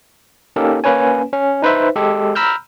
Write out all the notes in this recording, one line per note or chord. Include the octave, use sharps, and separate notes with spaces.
A#3 C#4 D#4 G4 A4 A#4
A#3 C#4 B4 C#5 G#5
C#4
D#4 B4 C5 E5
G#3 G4 A4
A#5 B5 E6 F6 G6